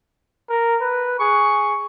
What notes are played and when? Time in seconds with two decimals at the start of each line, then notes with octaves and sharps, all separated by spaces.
0.49 A#4
0.81 B4
1.20 G#4 C#6